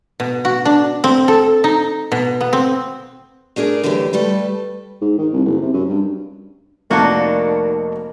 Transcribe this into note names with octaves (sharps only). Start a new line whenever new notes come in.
B2
F#4
D4
C4
A4
D#4
B2
B3
C4
A3 D4 G#4 A#4 D5
D3 E3 F#3 A3 G4
G3 A3 A4 B4
G#2
D#3
C2
F#1
C3
F#2
G2
F1 D#3 A#3 D4 F#4 B4 A5